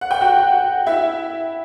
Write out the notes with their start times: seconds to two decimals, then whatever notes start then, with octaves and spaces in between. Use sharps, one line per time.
0.01 F#5
0.11 G5
0.21 F#4 F#5
0.86 E4 E5